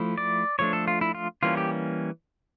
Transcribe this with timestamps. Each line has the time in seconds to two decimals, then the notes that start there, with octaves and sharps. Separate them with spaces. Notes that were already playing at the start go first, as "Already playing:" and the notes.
Already playing: F3 A3 E4
0.18 D5
0.59 F3 A3 D4 C#5
0.73 A4
0.88 F4
1.01 E4
1.15 F4
1.43 E3 G3 A#3 C#4 F4
1.57 G4